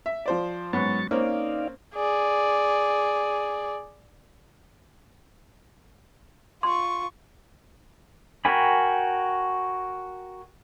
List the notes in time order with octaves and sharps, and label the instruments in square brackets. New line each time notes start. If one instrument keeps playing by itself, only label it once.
[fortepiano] E5
F3 C5 D5
[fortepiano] G#2 B3 C#4 [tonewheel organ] F#3 C#6 A6
[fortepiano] A#3 C4 C#4 [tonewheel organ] D#4 D5 F5
[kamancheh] G#4 D5
[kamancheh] F4 C#6 [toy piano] C6
[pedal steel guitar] F#4 A#4 G5 G#5 B5